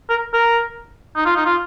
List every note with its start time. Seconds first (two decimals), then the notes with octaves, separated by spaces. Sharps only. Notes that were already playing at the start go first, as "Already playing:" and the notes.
0.10 A#4
0.34 A#4
1.16 D#4
1.26 F4
1.36 D#4
1.45 F4